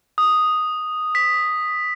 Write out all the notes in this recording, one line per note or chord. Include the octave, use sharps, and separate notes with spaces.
D#6
B6